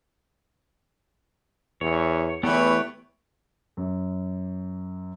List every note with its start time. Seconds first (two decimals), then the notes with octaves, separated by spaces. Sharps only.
1.81 E2 C#5
2.43 E2 E3 A3 B3 G4 B4 C#5
3.77 F#2